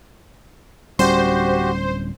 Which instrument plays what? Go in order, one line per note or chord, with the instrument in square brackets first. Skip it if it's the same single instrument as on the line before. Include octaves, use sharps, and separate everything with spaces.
[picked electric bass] D1 G3 C#4 [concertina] F#4 G4 [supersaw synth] C5